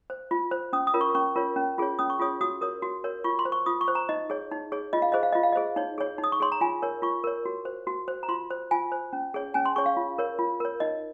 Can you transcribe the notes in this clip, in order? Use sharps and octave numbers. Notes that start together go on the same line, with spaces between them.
C5
F4
C5
C#4 D#6
D#6
F4 A#4 C#5
C#6
C#4 C#6
F4 A#4 C#5
C#4
F4 G#4 C#5
C#4 D#6
C#6
F4 G#4 C#5 D#6
F#4 D#6
A#4 C#5 D#6
F#4
A#4 C#5
F4 C#6
C6
C5
C#6
F4 D#6
C#6
C5
A#5
D#4 D#5
G#4 C#5
D#4
G#4 C#5
F4 D#5
F5
G#4 C5 D#5
F5
F4 D#5
F5
D#5
G#4 C5
D#4 C#5
G#4 C#5
D#4
D#6
C#6
G#4 C#5 C6
A#5
F4 G#5
A#4 C#5
F4 C#6
A#4 C#5
F#4
C5
F#4
C5
A#5
F4 C6
C5
F4 G#5
C5
C#4
G#4 C#5
C#4 G#5
C6
G#4 C#5 C#6
F5
F4
A#4 C#5
F4
A#4 C#5
D#4 D#5